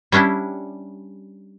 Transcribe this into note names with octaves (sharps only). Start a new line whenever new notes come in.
G3 C#4 D4 E4 G4